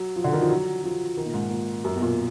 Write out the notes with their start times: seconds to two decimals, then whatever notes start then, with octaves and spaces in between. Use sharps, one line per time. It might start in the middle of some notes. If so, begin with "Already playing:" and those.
Already playing: F#3
0.16 F3
0.24 D3
0.33 D#3
0.42 F3
0.49 F#3
0.84 F3
1.17 D#3
1.26 A#2
1.34 G#2
1.50 A#2
1.85 F#2
1.96 B2
2.02 A#2